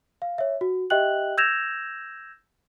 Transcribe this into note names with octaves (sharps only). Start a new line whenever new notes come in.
F5
C#5 E5
F#4
G4 D#5 E5 G5 F#6 F#7
E6 G6 G#6 A#6 E7 F7